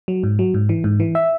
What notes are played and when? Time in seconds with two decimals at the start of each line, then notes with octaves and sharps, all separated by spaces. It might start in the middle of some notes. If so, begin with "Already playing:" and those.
0.08 F#3
0.23 G#2
0.39 F#3
0.54 G#2
0.69 E3
0.84 G#2
1.00 E3
1.15 E5